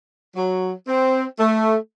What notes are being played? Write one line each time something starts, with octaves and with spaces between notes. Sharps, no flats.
F#3
C4
A3